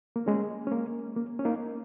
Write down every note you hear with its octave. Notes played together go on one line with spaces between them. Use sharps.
A#3
G#3 C#4
C#4
A#3
A#3
C#4
A#3 D#4